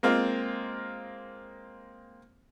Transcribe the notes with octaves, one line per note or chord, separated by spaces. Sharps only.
G#3 A#3 C4 F4